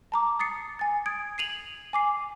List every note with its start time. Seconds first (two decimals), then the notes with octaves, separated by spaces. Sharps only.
0.12 A5 A#5 D6
0.39 D#6 A6 C7 C#7
0.79 G#5 A6
1.06 D#6 G#6 D7
1.38 C7 D#7 F7 F#7
1.93 G#5 D6 C7